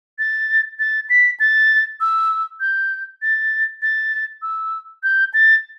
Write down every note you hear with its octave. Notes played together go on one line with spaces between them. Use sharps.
A6
A6
B6
A6
E6
G6
A6
A6
E6
G6
A6